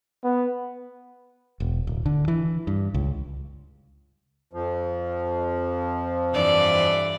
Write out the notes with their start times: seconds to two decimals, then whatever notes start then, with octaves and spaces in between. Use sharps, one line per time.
0.24 B3
1.60 E1
1.87 D1
2.06 D3
2.28 E3
2.67 G2
2.94 C#2
4.53 F2 F3
6.32 G2 E3 D5